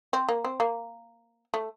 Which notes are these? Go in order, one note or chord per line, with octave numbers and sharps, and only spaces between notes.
C4
A#3
C4
A#3
A3